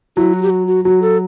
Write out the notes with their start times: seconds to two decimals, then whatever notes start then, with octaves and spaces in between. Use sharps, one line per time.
0.16 F#3 E4
0.34 F#4
0.43 G4
0.50 F#4
0.67 F#4
0.84 F#3 F#4
1.02 A4